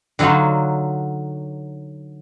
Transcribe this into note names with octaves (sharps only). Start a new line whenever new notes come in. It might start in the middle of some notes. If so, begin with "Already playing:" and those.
D3 F#3 D#4 F4 F#4